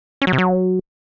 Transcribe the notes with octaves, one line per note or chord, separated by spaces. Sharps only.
C#4
F#3
C3
F#3